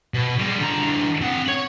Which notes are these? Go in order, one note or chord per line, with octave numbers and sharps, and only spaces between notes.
B2
G3 G#3
D3 A#5
E3 D4
C4 F#5
C#5